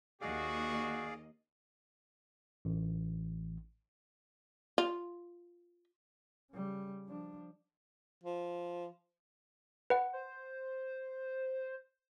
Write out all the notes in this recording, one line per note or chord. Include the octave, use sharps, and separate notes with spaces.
D#2 D#3 F#4 G#4 D5 D#5 F5
A1
F4
C#3 G3
F3 D4
F3
B4 F#5
C5